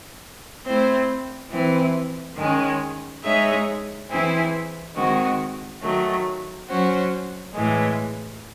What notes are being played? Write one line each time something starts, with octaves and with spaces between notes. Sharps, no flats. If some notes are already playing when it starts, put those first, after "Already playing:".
A3 C4 E4 C5
E3 C4 E4
D#3 G#3 C#4
G#3 D#4 G#4 C#5 E5
E3 C4 E4 G#4 C5
D#3 G#3 C4 F#4
D#3 F#3 A3
F#3 C#4 F#4 C5
A2 E3 G#3